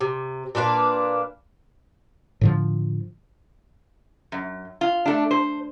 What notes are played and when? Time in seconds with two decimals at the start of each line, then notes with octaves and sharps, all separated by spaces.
0.01 C3
0.55 A#2 D4 B4 F5
2.41 A2 D3 F3
4.32 F#2
4.81 F4
5.06 A3 D4
5.31 C5